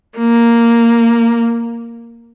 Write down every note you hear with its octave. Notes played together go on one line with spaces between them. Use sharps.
A#3